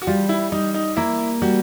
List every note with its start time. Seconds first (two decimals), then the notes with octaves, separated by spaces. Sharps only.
0.02 F#4
0.07 G3 F4
0.29 E4
0.52 G3 D#4
0.74 D#4
0.97 A#3 E4
1.42 G3 F#4